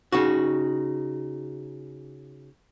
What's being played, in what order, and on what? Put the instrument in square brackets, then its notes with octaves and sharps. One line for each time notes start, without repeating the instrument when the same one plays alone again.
[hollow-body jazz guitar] C#3 D#4 F#4